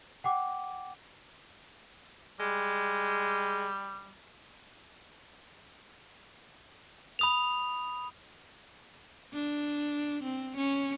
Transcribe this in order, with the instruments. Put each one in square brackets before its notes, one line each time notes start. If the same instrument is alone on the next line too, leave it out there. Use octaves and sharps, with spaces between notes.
[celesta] F#5 G5 D6
[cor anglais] G3 [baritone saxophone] G#3
[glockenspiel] B5 D#6 F7
[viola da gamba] D4
C4
C#4